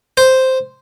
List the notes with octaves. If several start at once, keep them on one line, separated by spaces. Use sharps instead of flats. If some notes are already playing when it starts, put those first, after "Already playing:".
C5